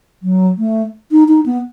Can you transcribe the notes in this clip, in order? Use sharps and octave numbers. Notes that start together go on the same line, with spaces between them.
F#3
A3
D#4
D#4
B3